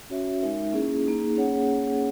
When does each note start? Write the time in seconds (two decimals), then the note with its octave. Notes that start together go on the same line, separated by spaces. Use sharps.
0.10 C#4 F#4 C#5 E5
0.41 G#3 D#4 A#4 E5
0.72 A#3 C#4 E4 G#4
1.04 A#3 D#4 G#4
1.36 A#3 C#4 G#4 C#5 F#5